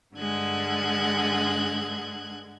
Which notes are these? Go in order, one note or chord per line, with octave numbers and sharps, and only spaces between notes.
G2 D3 G#3 F#6 G#6